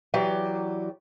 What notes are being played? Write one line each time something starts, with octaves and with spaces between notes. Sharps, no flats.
E3 F#3 G4 D5